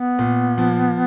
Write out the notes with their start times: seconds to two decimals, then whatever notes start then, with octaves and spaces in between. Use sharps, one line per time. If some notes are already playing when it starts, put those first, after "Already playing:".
Already playing: B3
0.19 A#2
0.58 F3